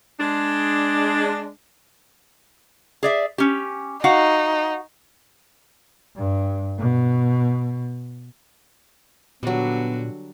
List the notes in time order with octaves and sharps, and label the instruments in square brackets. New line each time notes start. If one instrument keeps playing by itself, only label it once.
[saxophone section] G#3 D4
[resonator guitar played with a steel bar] G#4 D5 E5
C#4 G4
[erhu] D#4 [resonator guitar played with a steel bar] F#4 F5 F#5
[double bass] G2
B2
[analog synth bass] A#2 [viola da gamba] D3 F#4 [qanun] F#3 G3 [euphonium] B3